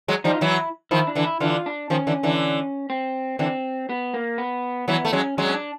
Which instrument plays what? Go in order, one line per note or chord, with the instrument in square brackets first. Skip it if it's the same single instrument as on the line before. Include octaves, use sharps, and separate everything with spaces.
[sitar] F#3 G#3
[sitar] F3 G3 [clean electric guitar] D#4
[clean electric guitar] F4
[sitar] E3 F#3 [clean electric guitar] E4
[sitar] D#3 F3 [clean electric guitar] E4
[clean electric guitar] D4
[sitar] D3 E3
[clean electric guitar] E4
[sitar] D3 E3 [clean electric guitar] F4
[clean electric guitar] D4
[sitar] D#3 F3 [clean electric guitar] C#4
[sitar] D3 E3
D3 E3
[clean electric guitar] C4
[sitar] D3 E3 [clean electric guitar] C4
[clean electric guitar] B3
A#3
B3
[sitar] E3 F#3 [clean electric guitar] B3
[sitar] A3
[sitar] F#3 G#3 [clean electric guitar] C#4
[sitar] F#3 G#3 [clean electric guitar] C#4
[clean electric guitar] C#4
D4